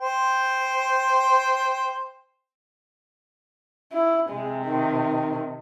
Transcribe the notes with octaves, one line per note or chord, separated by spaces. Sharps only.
C5 G5
E4
C3 G#3
D#3